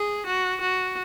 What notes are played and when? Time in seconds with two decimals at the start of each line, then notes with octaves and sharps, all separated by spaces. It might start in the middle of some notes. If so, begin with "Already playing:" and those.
Already playing: G#4
0.26 F#4
0.61 F#4